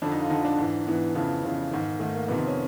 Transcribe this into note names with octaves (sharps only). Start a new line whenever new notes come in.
F2 D3 D4
D#4
F4
F2 D3 D#4
D4
G#2 E3
G#2 E3 B3
F2 C#3 E3
F2 C#3 E3
G#2 D#3
G#2 D#3 A3
A#3
F2 C3 D#3 B3
C4
C#4